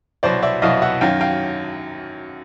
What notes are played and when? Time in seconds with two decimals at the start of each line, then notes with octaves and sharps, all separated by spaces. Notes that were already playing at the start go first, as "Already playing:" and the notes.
0.23 C2 B2 F#3 C5 D5
0.43 D5 E5
0.62 C2 B2 F#3 D#5 F5
0.82 E5 F#5
1.01 F#2 D#3 F#3 F5 G5
1.21 F5 G5